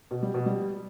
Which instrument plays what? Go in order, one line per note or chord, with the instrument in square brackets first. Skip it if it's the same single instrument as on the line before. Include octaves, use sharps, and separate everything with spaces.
[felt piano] B2
G3
B2
G3